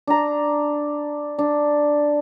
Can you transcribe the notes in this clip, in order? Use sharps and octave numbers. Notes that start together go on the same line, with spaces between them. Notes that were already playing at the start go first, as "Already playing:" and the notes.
D4 A#5
D4